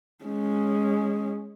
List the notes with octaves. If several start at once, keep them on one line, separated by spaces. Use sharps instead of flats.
G#3 C#4